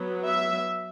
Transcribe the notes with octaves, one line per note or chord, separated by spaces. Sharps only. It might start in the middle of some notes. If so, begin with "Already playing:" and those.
Already playing: F#3 B3
E5